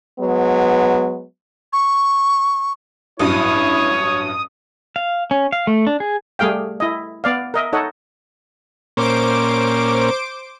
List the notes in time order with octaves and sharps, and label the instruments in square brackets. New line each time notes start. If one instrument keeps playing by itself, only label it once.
[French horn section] F#3 G#3 B3
[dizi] C#6
[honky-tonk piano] A1 G2 F#3 [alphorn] E4 [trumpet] C#5 [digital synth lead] D#6
[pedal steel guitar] F5
C#4
F5
A3
D4
G#4
[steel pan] G3 A3 G#4 F5 G5
E4 D#5
B3 D5 F5
A#4 D#5 E5
D#4 A4 C#5 D#5 F#5
[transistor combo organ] A#2 A#3 C#4 [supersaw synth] C5 D6 D7